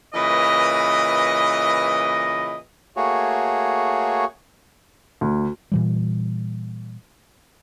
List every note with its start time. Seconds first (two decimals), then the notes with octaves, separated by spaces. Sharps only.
0.14 A#2 C#3 E3 B4 D#5
2.97 A3 A#3 F#4 G#4 C#5
5.21 D2
5.72 A#2 E3 G3